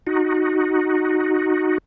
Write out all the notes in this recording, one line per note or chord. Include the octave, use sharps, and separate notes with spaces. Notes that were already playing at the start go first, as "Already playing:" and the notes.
D#4 F#4